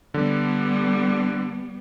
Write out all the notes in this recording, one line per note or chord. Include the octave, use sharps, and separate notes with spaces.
D3 G3 B3